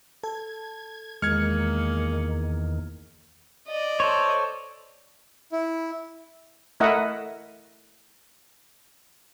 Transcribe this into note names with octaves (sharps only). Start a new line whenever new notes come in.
A4 G#6
E2 D#3 G#3 A#3 G#4 F6 G#6 C#7
D5 D#5
A4 C5 C#5
E4
A3 E4 A#4 D#5 E5 F#5